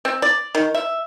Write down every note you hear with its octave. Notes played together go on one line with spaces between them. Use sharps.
C4
D5
D#3
E5